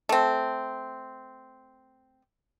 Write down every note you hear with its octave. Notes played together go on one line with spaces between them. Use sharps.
A3 C4